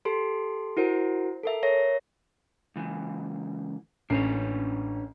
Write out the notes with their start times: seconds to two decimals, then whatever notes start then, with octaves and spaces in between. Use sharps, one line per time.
0.05 G4 A4 C6
0.77 E4 F#4 A#4 C5
1.43 A4 A#4 E5
1.63 A#4 C#5 E5 A#6
2.76 C#2 E3
4.10 A1 C#4 D4 B4 C#5 C7